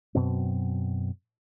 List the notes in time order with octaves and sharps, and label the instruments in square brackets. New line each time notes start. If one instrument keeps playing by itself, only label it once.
[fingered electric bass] F#2 B2 F#3 C4